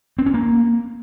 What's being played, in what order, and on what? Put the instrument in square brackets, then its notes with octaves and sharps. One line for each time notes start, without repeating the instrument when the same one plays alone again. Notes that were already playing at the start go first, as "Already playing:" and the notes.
[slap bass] C4
C#4
A#3